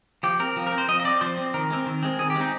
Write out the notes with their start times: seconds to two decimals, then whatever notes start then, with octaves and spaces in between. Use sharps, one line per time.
0.23 F3 G4
0.40 C4 A#4
0.56 F3
0.67 A#4
0.72 C4
0.78 C5
0.88 F3 D#5
1.00 D#5
1.04 C4 D5
1.21 F3 C5
1.38 C4
1.54 D#3 A#4
1.70 G#3 C4
1.86 D#3
2.03 G#3 C4
2.19 D#3 G#4
2.30 G4
2.36 G#3 C4 D#4